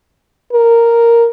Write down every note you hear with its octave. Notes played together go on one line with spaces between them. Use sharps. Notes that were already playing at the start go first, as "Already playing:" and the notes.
A#4